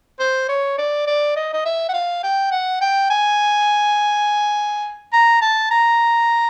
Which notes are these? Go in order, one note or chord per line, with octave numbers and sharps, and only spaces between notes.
C5
C#5
D5
D5
D#5
D#5
E5
F#5
F5
G5
F#5
G5
G#5
A#5
A5
A#5